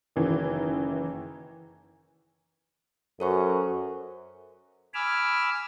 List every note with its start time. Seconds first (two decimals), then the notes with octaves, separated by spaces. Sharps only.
0.16 F#1 F#2 D#3 E3
3.20 F#2 A4 C5 C#6
4.94 G#5 B5 D6 E6 F6